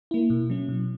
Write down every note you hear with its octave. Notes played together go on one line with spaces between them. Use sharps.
A#3 E4
B2
F#3 C#4
B2